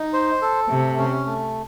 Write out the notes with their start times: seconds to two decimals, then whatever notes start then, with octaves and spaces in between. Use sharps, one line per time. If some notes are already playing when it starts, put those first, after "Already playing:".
Already playing: D#4
0.13 C5
0.42 A4
0.69 C3 A3
0.98 C#4
1.26 A3